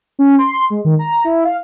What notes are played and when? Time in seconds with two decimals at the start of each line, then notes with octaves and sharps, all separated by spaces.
0.19 C#4
0.38 C6
0.70 G#3
0.85 D#3
0.99 A#5
1.24 E4
1.44 F5